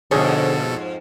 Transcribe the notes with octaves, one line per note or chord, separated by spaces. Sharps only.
F2 G#2 B2 D3 G#4 A4 C5 C#5